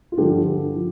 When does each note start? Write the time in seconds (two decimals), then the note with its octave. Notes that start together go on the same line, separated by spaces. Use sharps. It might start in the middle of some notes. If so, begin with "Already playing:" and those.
0.12 F4
0.18 G2 D3 F3 G4
0.75 F3